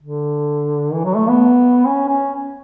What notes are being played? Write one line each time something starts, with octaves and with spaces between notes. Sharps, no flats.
D3
E3
F#3
A3
B3
C#4
C#4